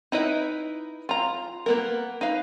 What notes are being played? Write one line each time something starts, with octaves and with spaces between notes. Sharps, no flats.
D#4 E4 B4 D#5
F4 A#5
A#3 B3 A#4
D#4 B4 F5